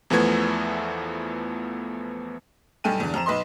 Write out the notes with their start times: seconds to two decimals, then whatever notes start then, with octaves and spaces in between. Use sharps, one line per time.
0.10 E2 E3 F3 A3 B3 G#6
2.84 B1 G2 A4 G5 G#5 D#7
3.00 E2 D3
3.14 F2 A#5 E7
3.26 B1 B4 D#5 C6